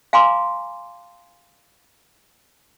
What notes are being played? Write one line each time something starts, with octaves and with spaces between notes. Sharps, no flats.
F5 G#5 A#5 C6 D6